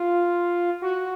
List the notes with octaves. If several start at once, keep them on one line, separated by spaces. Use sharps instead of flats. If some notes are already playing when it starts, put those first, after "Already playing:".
Already playing: F4
F#4